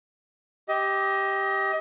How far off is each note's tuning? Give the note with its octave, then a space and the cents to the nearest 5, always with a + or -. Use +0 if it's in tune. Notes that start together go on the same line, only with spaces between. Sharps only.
G4 +0 D#5 +30